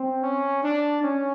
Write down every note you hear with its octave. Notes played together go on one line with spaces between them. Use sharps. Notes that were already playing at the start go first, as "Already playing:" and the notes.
Already playing: C4
C#4
D4
C#4